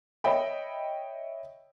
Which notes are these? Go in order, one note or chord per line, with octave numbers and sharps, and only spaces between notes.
C#5 D#5 E5 G5 B5